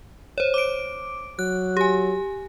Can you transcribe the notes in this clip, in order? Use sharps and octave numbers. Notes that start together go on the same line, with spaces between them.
C5 C#5
D6 D7
F#3 F#6
G4 G#5